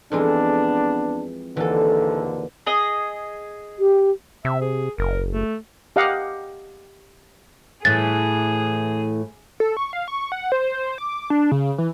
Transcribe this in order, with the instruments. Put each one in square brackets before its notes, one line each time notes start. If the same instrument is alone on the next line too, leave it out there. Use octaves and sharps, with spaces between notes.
[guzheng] F2 E3 G#3 [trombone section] B3 D4
[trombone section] A#1 D#2 D3 [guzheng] E3 A4
[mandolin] G#4 D#5
[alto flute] G4
[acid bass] C3 [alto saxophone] E5
[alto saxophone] G#4
[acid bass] F#1 [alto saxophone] A#4
[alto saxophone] A3
[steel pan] G4 D#5 F5 F#5
[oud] A2 E3 [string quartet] G#4 [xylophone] A6
[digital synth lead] A4
C#6
F5
C#6
F#5
C5
D6
D4
C#3
E3